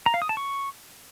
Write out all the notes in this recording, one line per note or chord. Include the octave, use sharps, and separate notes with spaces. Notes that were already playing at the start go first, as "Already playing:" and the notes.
A#5
F5
D#6
A5
C#6